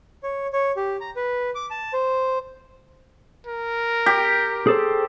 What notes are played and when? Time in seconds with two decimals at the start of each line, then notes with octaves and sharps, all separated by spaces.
0.23 C#5
0.53 C#5
0.76 G4
1.01 A#5
1.16 B4
1.55 D6
1.70 A5
1.93 C5
3.47 A#4
4.06 G4
4.67 G#4 A4 C5